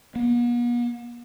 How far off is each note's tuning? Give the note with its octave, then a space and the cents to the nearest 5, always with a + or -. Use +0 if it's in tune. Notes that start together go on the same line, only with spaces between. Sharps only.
B3 -45